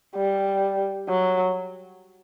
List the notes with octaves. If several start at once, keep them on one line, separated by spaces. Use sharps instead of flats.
G3
F#3